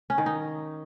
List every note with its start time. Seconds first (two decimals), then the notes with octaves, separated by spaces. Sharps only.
0.10 C#4
0.18 D#3
0.26 D#4